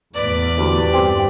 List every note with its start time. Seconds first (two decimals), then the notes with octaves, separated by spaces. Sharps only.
0.14 E2 A2 E3 B4 D5
0.58 D2 G4
0.93 G2 C4